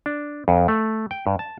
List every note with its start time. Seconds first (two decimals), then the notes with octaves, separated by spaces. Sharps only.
0.06 D4
0.48 F2
0.68 A3
1.11 G5
1.27 G2
1.39 A5